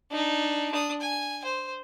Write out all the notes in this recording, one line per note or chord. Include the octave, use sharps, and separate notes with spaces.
D4 D#4
D4 D#6
G#5
C5